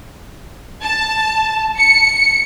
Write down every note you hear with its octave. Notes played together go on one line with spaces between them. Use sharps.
A5
C#7